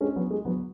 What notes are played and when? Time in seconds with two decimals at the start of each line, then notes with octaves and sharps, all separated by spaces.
0.01 G#3 C#4
0.16 F#3 B3
0.31 G#3
0.45 F#3 B3